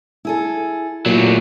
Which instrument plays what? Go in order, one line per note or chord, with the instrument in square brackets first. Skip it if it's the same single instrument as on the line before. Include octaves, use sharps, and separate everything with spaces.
[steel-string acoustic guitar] E4 G#4 A4
[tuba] A#2 [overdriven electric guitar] F#3 A3 [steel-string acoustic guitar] E4 G4